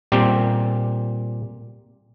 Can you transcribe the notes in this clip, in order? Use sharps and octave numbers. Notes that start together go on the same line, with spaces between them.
A#2 G3 C4 G4